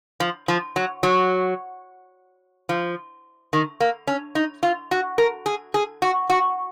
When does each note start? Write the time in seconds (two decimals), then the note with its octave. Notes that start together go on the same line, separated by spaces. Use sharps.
0.20 F3
0.48 F3
0.76 F#3
1.03 F#3
2.69 F3
3.53 D#3
3.80 A#3
4.07 C#4
4.35 D#4
4.63 F4
4.91 F#4
5.18 A#4
5.46 G#4
5.74 G#4
6.02 F#4
6.30 F#4